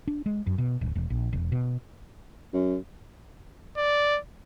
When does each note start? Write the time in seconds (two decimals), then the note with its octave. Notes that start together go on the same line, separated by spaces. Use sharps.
0.07 D4
0.26 G#3
0.47 F#2
0.58 B2
0.81 D1
0.95 E1
1.10 A#1
1.33 E1
1.52 B2
2.53 F#2
3.77 D5